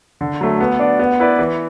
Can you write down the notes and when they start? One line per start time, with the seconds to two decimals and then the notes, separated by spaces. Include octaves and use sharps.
0.21 D3
0.41 F#3 A3
0.60 B3
0.79 D4 F#4 D5
0.99 B3
1.20 E4 B4 D5
1.39 E3